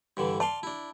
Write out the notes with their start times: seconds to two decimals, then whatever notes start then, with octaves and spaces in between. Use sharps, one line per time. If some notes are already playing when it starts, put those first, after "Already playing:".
0.17 G2 D3 E3
0.40 D5 F5 A5 C6
0.63 D4 E4